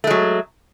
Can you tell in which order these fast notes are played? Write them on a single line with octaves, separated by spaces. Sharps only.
A3 G#3 F#3